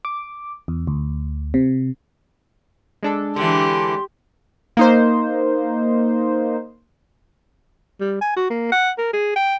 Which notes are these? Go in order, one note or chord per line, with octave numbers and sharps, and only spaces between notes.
D6
E2
D2
C3
G#3 D4 A4
D3 E3 G4 C6
A#3 D#4 C5
G3
G#5
F#4
A#3
F#5
A#4
G#4
G5